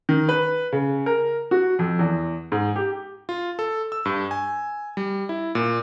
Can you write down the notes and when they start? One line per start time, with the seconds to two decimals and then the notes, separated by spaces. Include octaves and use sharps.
0.09 D#3
0.29 B4
0.72 C#3
1.06 A#4
1.51 F#4
1.79 F2
1.99 E2
2.52 G#2
2.76 G4
3.29 F4
3.59 A4
3.92 E6
4.05 G2
4.31 G#5
4.97 G3
5.29 E4
5.55 A#2